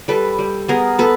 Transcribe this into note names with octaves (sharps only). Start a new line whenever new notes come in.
G3 A4 B4
G3
B3 G#4 A#4
B3 A4 B4